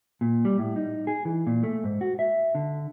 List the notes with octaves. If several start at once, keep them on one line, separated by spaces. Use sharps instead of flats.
A#2
G3
A2
D#4
G#4
E3
A#2
A3
G#2
F#4
E5
D3